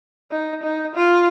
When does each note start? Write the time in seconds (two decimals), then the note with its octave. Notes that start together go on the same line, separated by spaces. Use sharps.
0.31 D#4
0.63 D#4
0.95 F4